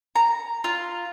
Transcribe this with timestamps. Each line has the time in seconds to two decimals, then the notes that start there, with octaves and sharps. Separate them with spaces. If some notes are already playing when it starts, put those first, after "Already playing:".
0.16 A#5
0.64 F4